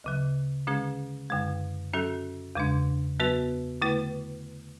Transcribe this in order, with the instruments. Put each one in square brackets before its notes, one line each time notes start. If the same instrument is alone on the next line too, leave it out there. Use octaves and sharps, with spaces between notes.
[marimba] D2 C#3 F#3
D3 G#3 C#4 G#4
F#2 D3 G#3
F#3 C#4 F#4 A4
E2 C#3 G#3 D4
F#3 B3 F#4 B4
D3 A3 E4 B4